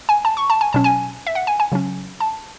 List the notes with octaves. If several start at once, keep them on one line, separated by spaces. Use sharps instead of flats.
G#5
A5
C#6
A5
G#5
B2 F#3 C#4 A5
G#5
E5
F#5
G#5
G#5
C#3 F#3 C#4
A5